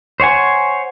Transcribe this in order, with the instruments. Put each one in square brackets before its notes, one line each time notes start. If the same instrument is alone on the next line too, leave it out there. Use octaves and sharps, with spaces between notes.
[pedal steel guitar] C5 C#5 F#5 G#5